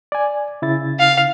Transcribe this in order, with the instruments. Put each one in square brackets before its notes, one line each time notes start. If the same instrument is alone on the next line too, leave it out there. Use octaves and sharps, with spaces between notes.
[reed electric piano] D5 G#5
C#3 E4 A6
[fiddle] F5